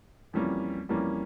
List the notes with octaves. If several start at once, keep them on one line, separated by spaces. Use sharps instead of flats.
F2 E3 G3 A#3 C#4
F2 E3 G3 A#3 C#4